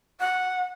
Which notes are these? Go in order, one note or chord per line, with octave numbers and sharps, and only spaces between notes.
F#5